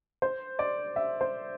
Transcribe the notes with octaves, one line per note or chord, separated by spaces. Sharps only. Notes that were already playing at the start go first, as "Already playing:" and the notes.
C5
D5
E5
C5